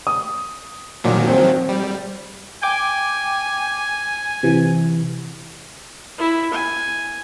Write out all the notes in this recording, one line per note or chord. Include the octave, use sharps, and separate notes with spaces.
D#6
A#2 D#3 F3 F#3
C4
G3
G5 G#5 D6 G6
C3 E3
E4
G#5